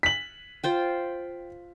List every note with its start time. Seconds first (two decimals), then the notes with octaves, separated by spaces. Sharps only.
0.03 B6 F#7
0.64 F4 C5 G5